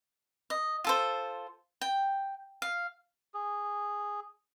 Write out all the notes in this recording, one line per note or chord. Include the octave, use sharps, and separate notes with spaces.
D#5
F4 A4 C5
G5
F5
G#4